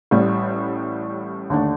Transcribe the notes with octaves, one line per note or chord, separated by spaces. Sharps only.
A1 A2 G3
D#2 D3 A3 D4